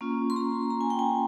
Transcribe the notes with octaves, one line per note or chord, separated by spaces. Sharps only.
A#3 C#4 F4
C6
A#5
A#5
G#5
G5
G#5